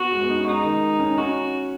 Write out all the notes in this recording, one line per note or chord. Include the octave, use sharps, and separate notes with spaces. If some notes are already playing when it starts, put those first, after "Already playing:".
Already playing: B3 F#4
G#3
B3
D#4
C#4
G#3 D#4
D#3
C#4
C#4 F#4